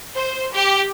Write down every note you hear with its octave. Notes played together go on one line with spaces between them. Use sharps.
C5
G4